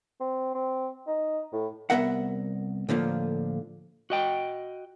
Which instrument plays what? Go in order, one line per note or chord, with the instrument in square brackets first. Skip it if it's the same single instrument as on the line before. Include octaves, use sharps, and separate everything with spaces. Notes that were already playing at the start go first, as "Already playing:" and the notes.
[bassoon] C4
C4
D#4
A2
[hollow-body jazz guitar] C2 F3 B3 A#4 E5 F#5
A2 D3 F3 A#3
[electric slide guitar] F#4 D#5 G5